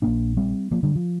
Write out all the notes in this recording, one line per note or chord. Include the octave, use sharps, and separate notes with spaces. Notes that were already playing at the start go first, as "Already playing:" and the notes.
A#1 A#2 A#3 D4
G3 C4
F3 A#3
D3 G3
F3